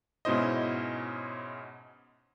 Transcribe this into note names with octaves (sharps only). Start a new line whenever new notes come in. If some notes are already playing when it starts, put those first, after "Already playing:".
G#2 B2 C#4 E4 C5 D#5